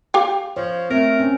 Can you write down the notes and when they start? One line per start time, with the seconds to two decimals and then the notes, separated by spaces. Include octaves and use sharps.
0.14 G4 F5 G5
0.57 F3 C#5
0.90 A3 C4 A#4
1.19 C#4